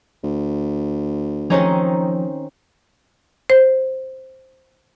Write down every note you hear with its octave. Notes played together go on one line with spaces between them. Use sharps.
D2
D#3 F3 C4 C#4 D#4 G#4 A#5
C5